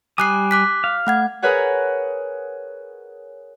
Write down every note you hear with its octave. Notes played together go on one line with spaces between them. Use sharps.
G3 G#5 D6 D#6 F#6 C7
D6 F#6 B6
F5
A3 F#5 G#6
G#4 A#4 B4 C#5 F#5